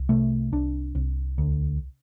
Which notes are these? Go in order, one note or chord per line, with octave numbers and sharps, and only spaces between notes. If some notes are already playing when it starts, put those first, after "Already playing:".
Already playing: C2
C3 A3
C2 D4
C2
D2